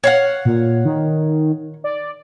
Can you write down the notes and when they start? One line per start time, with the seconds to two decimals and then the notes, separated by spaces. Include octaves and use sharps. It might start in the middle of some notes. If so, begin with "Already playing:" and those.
0.04 C#5 F5 F#5
0.45 A#2
0.85 D#3
1.84 D5